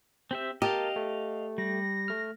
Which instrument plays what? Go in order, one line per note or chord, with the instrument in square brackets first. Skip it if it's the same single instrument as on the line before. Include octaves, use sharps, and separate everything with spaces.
[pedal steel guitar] C4 G4 E5
[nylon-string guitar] G4 [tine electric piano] A#4 A5 F6 [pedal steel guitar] D#5 F5
[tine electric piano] A3
[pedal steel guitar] G3 [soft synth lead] A#6
[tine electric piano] A3 F6